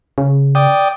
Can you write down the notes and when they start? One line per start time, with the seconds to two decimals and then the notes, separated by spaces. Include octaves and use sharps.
0.18 C#3
0.55 D5 G5 D#6